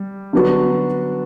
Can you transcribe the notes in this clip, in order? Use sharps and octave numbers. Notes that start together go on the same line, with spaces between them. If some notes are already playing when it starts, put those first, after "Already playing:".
Already playing: G3
D3 F#3 B3 D4 F#4